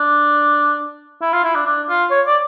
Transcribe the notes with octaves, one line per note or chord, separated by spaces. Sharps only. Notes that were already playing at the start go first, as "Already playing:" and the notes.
Already playing: D4
E4
F4
E4
D4
D4
F4
C#5
D5